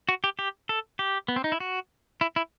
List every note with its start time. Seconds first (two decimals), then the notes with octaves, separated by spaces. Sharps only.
0.09 F#4
0.24 G4
0.39 G4
0.69 A4
0.99 G4
1.28 B3
1.36 C4
1.44 D#4
1.52 E4
1.60 F#4
2.21 E4
2.36 E4